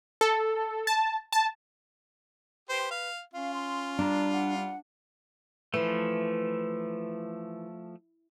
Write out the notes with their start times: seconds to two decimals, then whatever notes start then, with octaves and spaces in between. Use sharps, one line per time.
0.21 A4
0.87 A5
1.32 A5
2.69 G4 B4 C5
2.91 F5
3.34 C#4 F4 F5
3.54 C6
3.99 G3 D4 A#5
4.33 F#5
5.74 E3 F3 A3